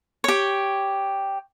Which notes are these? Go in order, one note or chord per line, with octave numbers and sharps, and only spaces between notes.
G4 C#5